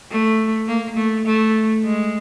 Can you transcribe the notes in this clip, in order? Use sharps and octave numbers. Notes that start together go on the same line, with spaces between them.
A3
A#3
A3
A3
G#3